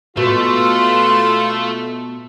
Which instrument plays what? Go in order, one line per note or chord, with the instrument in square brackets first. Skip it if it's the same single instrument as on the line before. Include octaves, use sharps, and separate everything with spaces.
[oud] B2 [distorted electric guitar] A3 [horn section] F4 A4 [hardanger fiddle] B4 C6